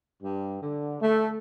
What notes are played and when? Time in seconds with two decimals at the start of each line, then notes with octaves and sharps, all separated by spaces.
0.23 G2
0.62 D3
1.02 A3